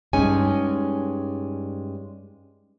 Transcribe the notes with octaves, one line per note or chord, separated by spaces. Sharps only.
G2 G#3 C#4 D#4 G#5